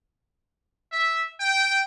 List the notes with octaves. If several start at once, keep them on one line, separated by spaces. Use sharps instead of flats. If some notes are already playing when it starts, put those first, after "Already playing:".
E5
G5